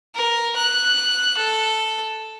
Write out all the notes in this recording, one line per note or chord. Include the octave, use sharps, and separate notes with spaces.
A#4
F#6
A4